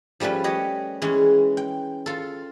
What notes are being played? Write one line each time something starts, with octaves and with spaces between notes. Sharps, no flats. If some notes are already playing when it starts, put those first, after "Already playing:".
F3 G3 A3 C#4 B4
G4 C#5 D#5
E3 G#3 C#4
G5
F4 A4